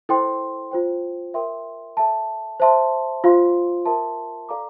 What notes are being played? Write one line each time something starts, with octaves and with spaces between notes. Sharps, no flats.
E4 A4 C5 G5 C6
F4 C5 G5
A#4 E5 G5 C6
A4 E5 A5
C5 E5 A5 C6
F4 C5 F5 C6
A#4 E5 A5 C6
A4 D5 F5 A#5 D6